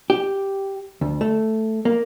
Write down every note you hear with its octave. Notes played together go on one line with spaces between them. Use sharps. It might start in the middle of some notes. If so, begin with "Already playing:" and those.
G4
D2
A3
A#3